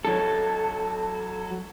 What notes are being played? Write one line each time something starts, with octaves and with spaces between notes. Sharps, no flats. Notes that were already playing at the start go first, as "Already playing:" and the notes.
F#3 A4